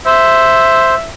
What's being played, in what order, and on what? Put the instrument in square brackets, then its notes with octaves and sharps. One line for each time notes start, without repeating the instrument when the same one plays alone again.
[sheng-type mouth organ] C5 [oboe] E5